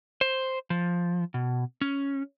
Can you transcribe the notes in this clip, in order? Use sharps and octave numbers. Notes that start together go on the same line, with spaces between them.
C5
F3
B2
C#4